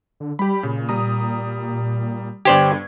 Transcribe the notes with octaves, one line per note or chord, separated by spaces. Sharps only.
D3
G3 G4 B5
A#2 C#3
G3 A#5 D#6
G2 D3 B3 G4 C5 D5 G#6